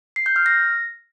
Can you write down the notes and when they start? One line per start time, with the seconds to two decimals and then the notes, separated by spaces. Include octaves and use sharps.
0.16 C7
0.26 G6
0.36 F6
0.46 A#6